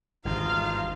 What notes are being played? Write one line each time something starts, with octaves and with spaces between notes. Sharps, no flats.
G#1 E2 G2 D#4 F4 C5 F5